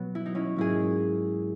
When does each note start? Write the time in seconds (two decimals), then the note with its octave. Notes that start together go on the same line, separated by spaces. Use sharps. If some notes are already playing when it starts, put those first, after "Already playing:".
Already playing: B2 F#3 B3
0.15 E4
0.26 D#4
0.35 C#4 E4
0.56 G#2 F#3 A#3 E4 G#4